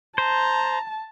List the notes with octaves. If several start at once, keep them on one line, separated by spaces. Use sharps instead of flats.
C5 A5 A#5